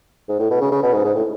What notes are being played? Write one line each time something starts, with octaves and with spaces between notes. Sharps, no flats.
G#2
A2
B2
C#3
C#3
B2
G#2
G#2
A2